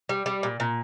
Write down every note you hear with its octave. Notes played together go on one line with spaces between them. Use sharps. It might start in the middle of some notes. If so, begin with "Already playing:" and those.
G3
G3
A#2
A#2